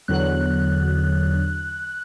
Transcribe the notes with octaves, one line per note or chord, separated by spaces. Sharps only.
E2 D3 F#3 F#6